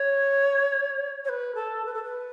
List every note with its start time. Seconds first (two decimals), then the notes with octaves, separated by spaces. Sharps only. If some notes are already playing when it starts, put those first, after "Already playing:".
Already playing: C#5
1.24 C#5
1.28 B4
1.55 A4
1.85 B4
1.93 A4
2.03 B4